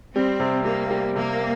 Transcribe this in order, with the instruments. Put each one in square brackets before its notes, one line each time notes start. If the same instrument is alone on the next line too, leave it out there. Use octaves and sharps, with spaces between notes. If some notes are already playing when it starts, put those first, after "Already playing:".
[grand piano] G3 [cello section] C4
[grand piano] C3
[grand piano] G3 [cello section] A#3
[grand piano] G3
[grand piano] C3 [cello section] A#3